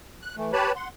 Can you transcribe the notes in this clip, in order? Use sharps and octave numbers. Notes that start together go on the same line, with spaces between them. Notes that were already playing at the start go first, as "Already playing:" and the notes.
F#6
E3 A3
G4 B4 C#5 A5 B5
F#5 C6